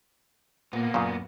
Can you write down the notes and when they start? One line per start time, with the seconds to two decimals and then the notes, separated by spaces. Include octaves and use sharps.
0.73 A#2 A#3 B3
0.94 F#2 A#2 C#3